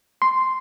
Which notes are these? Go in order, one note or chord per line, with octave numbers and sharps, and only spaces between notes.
C6